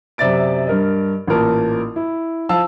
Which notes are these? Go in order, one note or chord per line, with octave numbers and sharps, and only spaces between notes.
F#2 C3 D5 E5 A6 D7
G2 A#4 D#5
A1 A#2 A#4 A5
E4
F3 F5 A5 E6